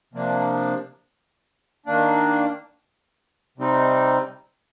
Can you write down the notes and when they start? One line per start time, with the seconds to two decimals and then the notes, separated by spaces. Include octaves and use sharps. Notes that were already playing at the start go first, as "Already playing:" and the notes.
0.14 C3 F3 A#3 D4
1.86 D#3 A#3 D4
3.58 C3 G3 C4 D#4